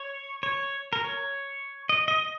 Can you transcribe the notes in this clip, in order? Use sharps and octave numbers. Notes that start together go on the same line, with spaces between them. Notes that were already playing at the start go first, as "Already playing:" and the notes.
Already playing: C#5
C#5
A#4
C#5
D#5
D#5